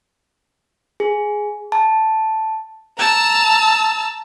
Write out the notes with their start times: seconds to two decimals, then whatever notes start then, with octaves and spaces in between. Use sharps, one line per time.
1.00 G#4
1.72 A5
2.98 A5 A#5 E6